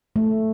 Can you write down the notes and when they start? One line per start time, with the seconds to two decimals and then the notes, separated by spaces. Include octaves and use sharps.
0.16 A3